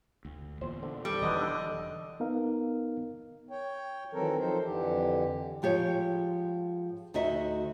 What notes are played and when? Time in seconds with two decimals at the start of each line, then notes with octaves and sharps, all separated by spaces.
0.25 D2
0.61 E2 A#2 C5
0.83 D3
1.05 G3 A4
1.22 E1 B2 D#3 E3 F#3 B3 D#5
1.36 D3 D4
2.20 B3 D#4 A#4 F5
3.50 C#5 G5
4.13 D#3 E3 F#3 C4 A4 A#4
4.38 F3 D#4 A4 C5
4.63 F2 D3 E3 G4
5.62 G#2 F3 G4 C#5
7.14 D2 D#4 F#4 C5 D#5 E5